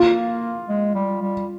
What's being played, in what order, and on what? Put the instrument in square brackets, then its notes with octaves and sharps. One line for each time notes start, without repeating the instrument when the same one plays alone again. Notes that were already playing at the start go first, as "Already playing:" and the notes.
Already playing: [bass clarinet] A#3 [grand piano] F4
[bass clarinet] G#3
G3
G3